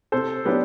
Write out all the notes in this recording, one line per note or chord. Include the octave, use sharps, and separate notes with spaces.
C3 A4 C5
F#3 B3 D4 G4 B4